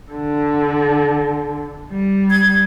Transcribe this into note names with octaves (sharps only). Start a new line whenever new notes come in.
D3
G3
G#6